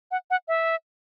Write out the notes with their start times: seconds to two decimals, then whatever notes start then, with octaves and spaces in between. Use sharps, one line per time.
0.11 F#5
0.30 F#5
0.48 E5